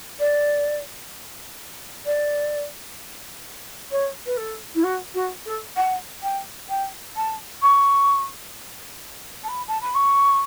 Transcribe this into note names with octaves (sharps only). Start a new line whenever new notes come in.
D5
D5
C#5
B4
A4
E4
F#4
F#4
A4
F#5
G5
G5
A5
C#6
A5
B5
A5
B5
C#6